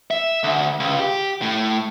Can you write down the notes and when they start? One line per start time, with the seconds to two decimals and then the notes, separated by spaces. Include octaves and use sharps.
0.11 E5
0.44 D2
0.80 C#2
0.99 G4
1.42 A2